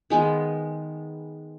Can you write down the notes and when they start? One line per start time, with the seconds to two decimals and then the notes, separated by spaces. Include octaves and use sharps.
0.10 D#3 G#3 B3